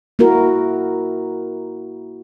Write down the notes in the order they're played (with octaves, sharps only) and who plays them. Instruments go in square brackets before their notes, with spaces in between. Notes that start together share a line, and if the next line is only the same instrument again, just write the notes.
[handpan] A#3 E4 F#4 A#4